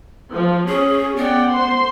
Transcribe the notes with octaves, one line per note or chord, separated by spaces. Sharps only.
F3
C#4 G#4
B3 D5 F#5 G5
C5 C6